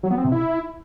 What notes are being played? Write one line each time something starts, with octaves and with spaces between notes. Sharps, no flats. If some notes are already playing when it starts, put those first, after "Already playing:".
F#3
B3
C4
C3
E4